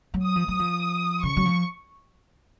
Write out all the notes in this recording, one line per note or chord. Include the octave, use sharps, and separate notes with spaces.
F#3
D#6
F3
F#3
F3
C#3 C#6
F#3
F3